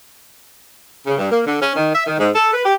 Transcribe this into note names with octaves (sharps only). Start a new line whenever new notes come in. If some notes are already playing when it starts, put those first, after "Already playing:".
C#3
G2
A#3
D3
C#4
D#3
E5
D#3
G#2
A4
B4
G4